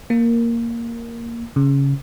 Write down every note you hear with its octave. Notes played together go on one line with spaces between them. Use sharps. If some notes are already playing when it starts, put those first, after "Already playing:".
A#3
C#3